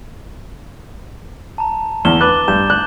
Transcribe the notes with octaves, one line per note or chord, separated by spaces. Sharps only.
A5 A#5
E2 E7 G7
B4 D6 F#6 A6
G2 G6 E7
F#6